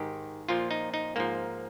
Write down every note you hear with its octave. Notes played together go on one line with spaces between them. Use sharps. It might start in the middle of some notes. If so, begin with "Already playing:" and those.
Already playing: G#2 D#3 G4
A#2 F3 F4
D#4
D#4
G#2 F3 A#3